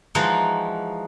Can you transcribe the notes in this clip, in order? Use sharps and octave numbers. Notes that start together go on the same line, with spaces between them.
E3 F3 G#3 D#4 F#4